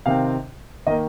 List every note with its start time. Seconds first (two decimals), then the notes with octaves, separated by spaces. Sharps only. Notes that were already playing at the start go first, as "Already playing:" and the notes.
0.06 C3 D#3 C4 F5
0.87 D#3 A#3 D#5